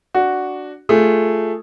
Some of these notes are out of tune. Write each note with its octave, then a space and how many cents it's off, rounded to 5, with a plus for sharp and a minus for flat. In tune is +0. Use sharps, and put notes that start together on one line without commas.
D4 +0 F#4 +0
A3 +0 F4 +0 G#4 +0